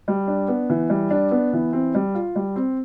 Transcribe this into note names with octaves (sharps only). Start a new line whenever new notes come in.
G3
D4
B3
E3
G3
D4
B3
E3
C4
G3
F4
G3
C4